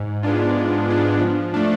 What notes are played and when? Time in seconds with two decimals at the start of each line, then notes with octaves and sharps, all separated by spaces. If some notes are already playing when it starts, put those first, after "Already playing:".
Already playing: G#2
0.23 G#3 B3 D4 F4
0.56 G#2
0.89 G#3 B3 D4 F4
1.21 F3
1.54 A3 D4